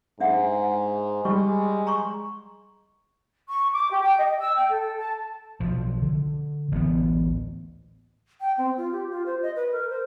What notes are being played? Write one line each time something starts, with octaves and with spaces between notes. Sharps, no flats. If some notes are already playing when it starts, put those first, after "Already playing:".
G#2 D4 E5 F#5
G3 G#3 C#6
A#5 C6 C#6
C#6
D6
G4
G5
D#5
E6
G5
A4
A5
B1 F3
D3
A1 D2 B3
G5
C4
F4
G4
F4
C5
D#5
B4
A#4
C5